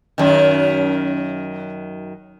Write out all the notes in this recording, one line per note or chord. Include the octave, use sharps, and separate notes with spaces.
F#2 D#3